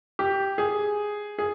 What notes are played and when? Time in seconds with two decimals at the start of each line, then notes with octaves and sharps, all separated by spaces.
0.19 G4
0.58 G#4
1.38 G#4